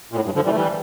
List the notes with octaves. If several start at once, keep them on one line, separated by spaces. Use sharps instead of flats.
A#2
A2
G2
D3 F3
E3 G3
A3
E3 G3